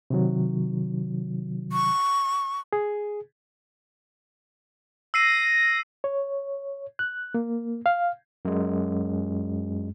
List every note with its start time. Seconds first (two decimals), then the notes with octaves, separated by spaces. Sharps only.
0.10 C3 D#3 F#3
1.72 C#6
2.73 G#4
5.14 E6 A#6 C7 D#7
6.04 C#5
6.99 F#6
7.34 A#3
7.86 F5
8.45 F#2 G#3